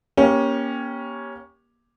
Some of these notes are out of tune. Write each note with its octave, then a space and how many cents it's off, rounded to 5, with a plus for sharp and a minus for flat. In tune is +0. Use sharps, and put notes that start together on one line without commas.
A#3 +30 C#4 +0 G4 +0